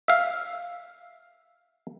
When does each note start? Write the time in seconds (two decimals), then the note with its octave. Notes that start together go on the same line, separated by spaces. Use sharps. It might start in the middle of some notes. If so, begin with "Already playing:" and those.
0.08 E5 F5